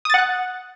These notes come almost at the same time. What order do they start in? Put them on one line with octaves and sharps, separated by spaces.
D#6 A6 F#5 F#6